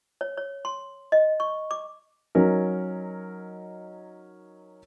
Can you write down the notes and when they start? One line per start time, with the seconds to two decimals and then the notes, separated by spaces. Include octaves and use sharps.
0.21 C#5
0.37 C#5
0.65 C6
1.12 D#5
1.40 C#6
1.71 D6
2.35 F#3 C#4 D#4 A#4